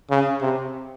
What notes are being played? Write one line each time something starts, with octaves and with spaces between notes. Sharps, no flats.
C#3
C3